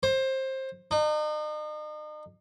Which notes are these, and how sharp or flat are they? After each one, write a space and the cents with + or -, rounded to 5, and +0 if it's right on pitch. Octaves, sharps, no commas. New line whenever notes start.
C5 +20
D#4 -40